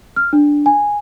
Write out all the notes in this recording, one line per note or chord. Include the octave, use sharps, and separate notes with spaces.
F6
D4
G#5